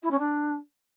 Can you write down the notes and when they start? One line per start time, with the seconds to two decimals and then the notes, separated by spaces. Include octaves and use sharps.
0.02 E4
0.10 C#4
0.18 D4